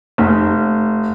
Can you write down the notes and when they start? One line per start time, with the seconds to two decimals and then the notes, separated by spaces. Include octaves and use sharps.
0.18 F1